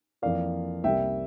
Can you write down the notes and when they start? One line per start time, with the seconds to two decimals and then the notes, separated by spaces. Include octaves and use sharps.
0.22 F2 E3 A#3 D5 F5
0.84 C2 C3 G3 A#3 E5 G5